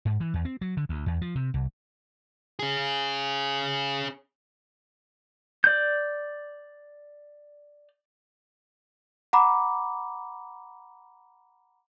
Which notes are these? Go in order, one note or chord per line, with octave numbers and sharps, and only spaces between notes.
G#2
E3
E2
C4
F#3
D3
D2
E2
F3
C3
C2
C#4 G#4
D5 G6
F#5 A#5 B5 D6